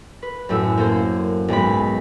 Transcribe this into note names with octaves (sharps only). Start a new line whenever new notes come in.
B4
F#2 A2 E6
A#3 C#4 A4 C5
B1 G#2 G#3 B5